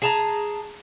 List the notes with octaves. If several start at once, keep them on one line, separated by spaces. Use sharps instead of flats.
G#4 A5 A#5